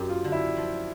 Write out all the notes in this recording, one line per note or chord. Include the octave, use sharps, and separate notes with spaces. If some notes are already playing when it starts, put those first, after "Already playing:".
Already playing: F#2 G4
F4
D3
E4
F3